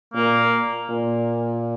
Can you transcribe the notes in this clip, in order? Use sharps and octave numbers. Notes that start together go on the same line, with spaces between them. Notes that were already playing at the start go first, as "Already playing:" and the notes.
A#2 A#3
A#2